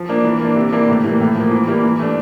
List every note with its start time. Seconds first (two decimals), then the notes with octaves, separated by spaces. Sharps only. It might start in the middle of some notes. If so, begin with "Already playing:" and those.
Already playing: F3
0.09 A#3 D4
0.24 E3
0.40 A#3
0.45 D4
0.56 C3
0.72 E3 G3 A#3 D4
0.89 A2
1.04 E3 G3 A#3
1.20 A2
1.35 F3 A#3
1.51 E3
1.68 G3 A#3 E4
1.84 E3
1.99 A3 D4